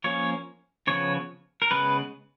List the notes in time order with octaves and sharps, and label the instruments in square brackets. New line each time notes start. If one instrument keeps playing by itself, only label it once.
[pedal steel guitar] F3 A#3 C#4 C#5
C#3 F3 B3 C#5
A#4
C#3 G#3 B3 B4